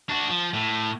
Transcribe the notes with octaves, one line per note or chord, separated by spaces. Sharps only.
D4 F#4
F3
A2